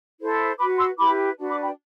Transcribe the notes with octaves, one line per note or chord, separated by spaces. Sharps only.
E4 A4 C5
F#4 B4 B5 D6
C6 E6
E4 G4 B4 B5 D6
D4 F#4 B4
B5 D6
G5 B5